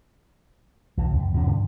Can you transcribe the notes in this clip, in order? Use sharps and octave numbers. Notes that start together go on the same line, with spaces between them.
B1 B2 E3
C#2 F#2
E2 G2 B2 C#4
G2 D3